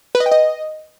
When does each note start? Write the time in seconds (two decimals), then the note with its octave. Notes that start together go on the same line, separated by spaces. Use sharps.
0.15 B4
0.20 D#5
0.26 G5
0.32 D#5